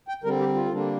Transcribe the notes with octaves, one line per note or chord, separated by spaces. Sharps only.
G5
D3 G3 C4 A#4
G4
F4
D3 G3 A#3 D4